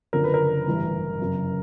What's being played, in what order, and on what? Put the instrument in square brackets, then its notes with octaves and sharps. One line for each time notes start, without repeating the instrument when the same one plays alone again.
[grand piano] F#1 F#2 D3 F3 A#4
B4
A#4
A1 G2 E3 G3
G1 F#2 C#3